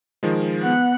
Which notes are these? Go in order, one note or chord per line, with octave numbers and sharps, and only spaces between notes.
D#3 F3 G#3
B3 F#5